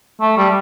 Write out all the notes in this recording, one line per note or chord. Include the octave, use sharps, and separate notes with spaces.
A3
G3